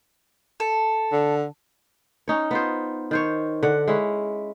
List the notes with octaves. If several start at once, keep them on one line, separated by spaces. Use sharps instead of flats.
A4
D3
C#4 D#4 C#5
B3 F4 C5
D#3 C5 C#5
D3 F#5
G#3 C#4 E4